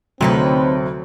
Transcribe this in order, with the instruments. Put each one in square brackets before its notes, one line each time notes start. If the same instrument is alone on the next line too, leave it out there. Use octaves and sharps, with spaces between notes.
[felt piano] D2 [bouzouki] C3 D#4 B4 [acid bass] F#3 [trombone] C4